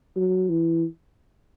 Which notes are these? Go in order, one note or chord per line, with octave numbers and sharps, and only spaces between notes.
F#3
E3